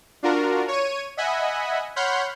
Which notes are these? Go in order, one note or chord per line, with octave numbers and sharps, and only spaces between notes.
D4 F4 F#4 A#4
C#5 C#6 D#7
D#5 E5 F#5 G#5 B5
C#5 F#5 B5 C6 F6 G6